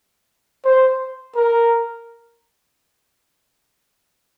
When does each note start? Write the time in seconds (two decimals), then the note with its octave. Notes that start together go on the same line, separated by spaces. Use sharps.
0.65 C5
1.36 A#4